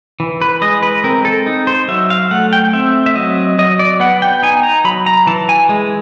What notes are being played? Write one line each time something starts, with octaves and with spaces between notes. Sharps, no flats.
E3
B4
G#3 D#5
B4
C4 A#4
A4
D#4
C5
F#3 E5
F5
A3 F#5
G5
C4 E5
E5
F#3 D#5
F#3 D#5
D5
B3 F#5
G5
D#4 G#5
A#5
F#3 B5
A#5
E3 A5
G#5
G#3